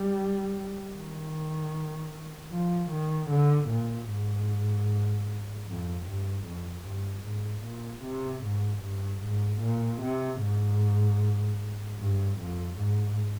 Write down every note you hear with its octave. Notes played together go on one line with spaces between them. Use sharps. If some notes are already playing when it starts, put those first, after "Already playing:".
Already playing: G3
D#3
F3
D#3
D3
A#2
G#2
F2
G2
F2
G2
G#2
A#2
C3
G#2
G2
G#2
A#2
C3
G#2
G2
F2
G#2